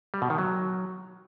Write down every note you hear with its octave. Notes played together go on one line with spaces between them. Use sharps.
G3
B2
D#3
F#3